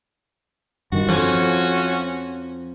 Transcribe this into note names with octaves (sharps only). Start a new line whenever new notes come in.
G2 D#3 F#4
F2 F3 C#4 G#5